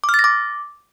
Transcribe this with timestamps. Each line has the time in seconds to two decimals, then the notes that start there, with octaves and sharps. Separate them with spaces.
0.04 D6
0.09 F6
0.14 A6
0.19 A#6
0.24 D6